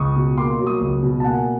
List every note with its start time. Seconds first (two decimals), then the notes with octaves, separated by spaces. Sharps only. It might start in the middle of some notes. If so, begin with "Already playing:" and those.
Already playing: C#2 C#6 D#6
0.16 B2
0.37 A#3 C6 D6
0.59 F#3
0.66 C#6 D#6
0.81 C#2
1.03 B2
1.20 A5
1.24 A#3 F#5 G#5